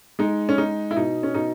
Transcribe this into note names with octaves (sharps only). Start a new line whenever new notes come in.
G#3 D#4
C#4
G#3 D#4
E4
B2 D#4
C#4
B2 D#4